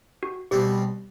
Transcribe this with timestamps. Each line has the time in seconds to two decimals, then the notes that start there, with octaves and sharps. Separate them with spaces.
0.23 F#4
0.51 B2 G3 C4 G4